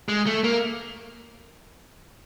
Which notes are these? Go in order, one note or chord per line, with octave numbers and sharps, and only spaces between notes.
G#3
A3
A#3